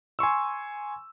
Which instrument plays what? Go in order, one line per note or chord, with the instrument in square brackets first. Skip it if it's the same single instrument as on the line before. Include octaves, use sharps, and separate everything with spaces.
[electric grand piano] G#5 C6 C#6 E6